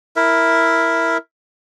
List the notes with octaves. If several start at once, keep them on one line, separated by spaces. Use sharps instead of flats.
E4 A#4 E5